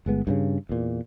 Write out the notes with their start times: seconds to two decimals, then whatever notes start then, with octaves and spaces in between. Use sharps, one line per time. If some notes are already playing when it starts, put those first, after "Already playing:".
0.06 G1 G#3 B3
0.27 G2 A#2 C#3
0.69 E2 A#2